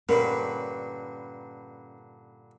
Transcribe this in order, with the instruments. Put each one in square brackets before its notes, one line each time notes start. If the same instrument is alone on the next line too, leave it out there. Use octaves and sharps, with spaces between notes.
[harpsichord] G2 A#2 D3 [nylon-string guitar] C#4 B4 [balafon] A#4